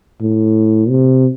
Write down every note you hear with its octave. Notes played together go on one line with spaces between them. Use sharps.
A2
C3